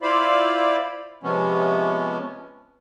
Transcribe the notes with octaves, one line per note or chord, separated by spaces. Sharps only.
E4 F4 C5 D5 F5 B5
C3 F3 G#3 B3 C#4